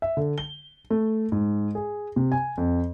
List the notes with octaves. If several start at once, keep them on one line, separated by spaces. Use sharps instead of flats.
E5
D3
G7
A3
G#2
G#4
C3
G#5
F2